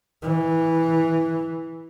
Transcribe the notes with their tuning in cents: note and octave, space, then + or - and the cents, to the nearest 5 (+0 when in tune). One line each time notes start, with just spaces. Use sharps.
E3 -10